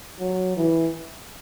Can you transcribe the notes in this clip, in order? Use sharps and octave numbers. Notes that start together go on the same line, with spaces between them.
F#3
E3